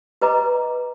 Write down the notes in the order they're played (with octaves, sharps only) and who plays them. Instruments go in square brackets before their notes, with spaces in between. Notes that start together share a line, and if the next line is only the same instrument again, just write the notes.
[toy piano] G4 B4 D#5 A#5 D6